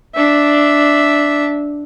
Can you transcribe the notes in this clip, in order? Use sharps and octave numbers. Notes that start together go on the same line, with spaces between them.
D4 E5